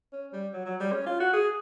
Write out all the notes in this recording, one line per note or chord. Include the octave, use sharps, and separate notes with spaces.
C#4
G3
F#3
F#3
G3
C#4
F4
F#4
G#4